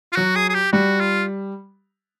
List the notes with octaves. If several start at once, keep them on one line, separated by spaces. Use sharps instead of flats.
F4
F#3 F#4
G#4
G#4
G4
G3 F#4
F4